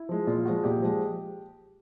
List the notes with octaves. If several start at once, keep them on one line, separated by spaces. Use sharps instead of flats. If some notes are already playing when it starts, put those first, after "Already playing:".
Already playing: E4
F3 G#3
A#2 F4
F3 G#3 F#4
A#2 G4
F3 G#3